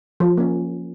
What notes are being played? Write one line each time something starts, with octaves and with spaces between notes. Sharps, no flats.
F3
A#3 C#4